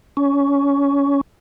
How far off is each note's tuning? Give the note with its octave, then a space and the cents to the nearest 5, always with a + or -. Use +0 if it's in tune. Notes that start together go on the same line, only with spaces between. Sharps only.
C#4 +20